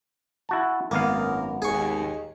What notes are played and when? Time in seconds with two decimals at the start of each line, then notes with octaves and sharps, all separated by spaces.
0.49 E4 F#4 A5
0.91 G#1 F#2 A#3 B3 A#4 F5
1.62 D#2 G#4 C#6